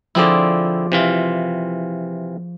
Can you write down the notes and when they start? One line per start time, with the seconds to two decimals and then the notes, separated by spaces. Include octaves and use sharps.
0.15 D3 F3 C4 E4 G#4 D5
0.92 C3 E3 F4